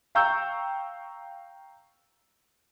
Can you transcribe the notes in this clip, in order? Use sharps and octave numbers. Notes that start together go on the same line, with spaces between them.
F5 G5 A#5 C#6 E6 G6